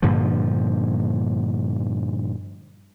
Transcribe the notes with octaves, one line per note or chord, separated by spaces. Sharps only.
G2 A#2 D3 F3